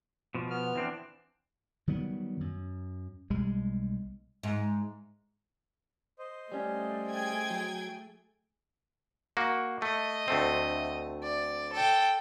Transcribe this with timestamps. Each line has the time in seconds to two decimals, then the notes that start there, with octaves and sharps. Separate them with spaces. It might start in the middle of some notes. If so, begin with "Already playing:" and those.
0.35 B2 F3
0.50 B3 F6
0.75 E3 C4 D4
1.88 D#3 F#3 G3 B3
2.41 F#2
3.30 B1 G3 G#3
4.43 G#2
6.19 C5 D#5
6.52 G3 A3 C#4
7.09 G#4 G5 G#6
7.50 F#3
9.37 A#3 F#4
9.82 A3 D#5
10.28 D2 A3 C4
11.23 D5
11.73 A4 G5